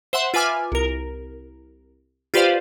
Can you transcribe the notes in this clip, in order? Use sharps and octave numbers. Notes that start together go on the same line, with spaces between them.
C5 E5 F#5 C6
F4 B4 E5 G#5 D6 F6
C2 A#4
F4 G4 B4 C5 D5 F5